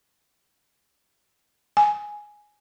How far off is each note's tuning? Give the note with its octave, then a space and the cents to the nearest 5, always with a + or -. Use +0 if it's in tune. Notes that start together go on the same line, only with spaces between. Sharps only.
G#5 +5